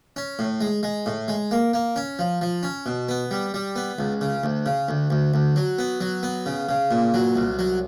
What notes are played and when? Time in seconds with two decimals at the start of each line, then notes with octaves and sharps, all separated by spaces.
0.16 C#4
0.39 A2
0.61 G#3
0.83 G#3
1.06 A2
1.28 G#3
1.51 A#3
1.73 A#3
1.96 C#4
2.19 F3
2.41 F3
2.63 C#4
2.86 B2
3.09 B3
3.31 G3
3.54 G3
3.76 B3
3.99 C#2
4.21 C#3
4.43 D2
4.66 C#3
4.89 D2
5.10 D2
5.34 D2
5.56 F#3
5.79 B3
6.01 F#3
6.23 B3
6.46 C#3
6.69 C#3
6.91 A#2
7.14 F#3
7.36 C2
7.59 F#3